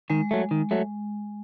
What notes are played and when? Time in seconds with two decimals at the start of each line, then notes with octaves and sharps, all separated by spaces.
0.10 D#3 G#3
0.31 F#3 A3
0.51 D#3
0.71 F#3 A3